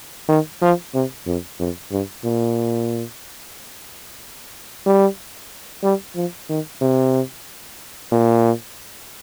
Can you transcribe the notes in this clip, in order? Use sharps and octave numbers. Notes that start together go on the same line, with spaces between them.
D#3
F3
C3
F2
F2
G2
A#2
G3
G3
F3
D#3
C3
A#2